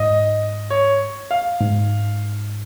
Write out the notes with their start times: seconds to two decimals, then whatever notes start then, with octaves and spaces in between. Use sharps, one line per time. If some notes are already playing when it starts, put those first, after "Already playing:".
Already playing: G#2 D#5
0.70 C#5
1.31 F5
1.61 G#2